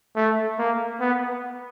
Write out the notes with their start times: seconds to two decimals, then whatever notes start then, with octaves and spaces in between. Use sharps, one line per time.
0.16 A3
0.59 A#3
1.00 B3